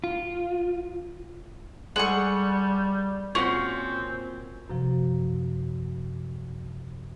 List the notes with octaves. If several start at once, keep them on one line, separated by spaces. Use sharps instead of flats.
F4
G3 G#3 G#4 A4 F#5 C#6
A#2 C4 C#4 F#4 G#4 F#5
F#2 C3 F3